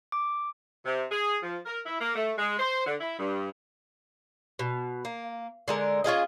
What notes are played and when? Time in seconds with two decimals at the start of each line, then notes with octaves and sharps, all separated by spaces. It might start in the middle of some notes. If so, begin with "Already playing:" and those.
0.12 D6
0.86 C3
1.11 G#4
1.43 F3
1.66 A#4
1.86 E4
2.01 A#3
2.16 A3
2.38 G#3
2.59 C5
2.87 D3
3.01 E4
3.19 G2
4.59 B2
5.05 A#3
5.68 D3 G#3 A#4
6.04 C#4 F4 G#4 D#5